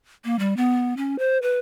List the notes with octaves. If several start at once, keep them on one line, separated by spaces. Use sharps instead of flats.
A#3
G3
B3
C#4
C5
B4